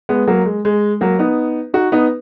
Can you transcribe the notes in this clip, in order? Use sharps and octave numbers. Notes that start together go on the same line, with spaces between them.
G#3 B3
F#3 A#3
G#3
G#3
F#3 A#3
B3 D#4
D#4 F#4
B3 D#4